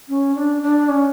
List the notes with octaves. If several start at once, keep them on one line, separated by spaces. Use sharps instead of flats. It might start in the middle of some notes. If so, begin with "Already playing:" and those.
C#4
D4
D4
C#4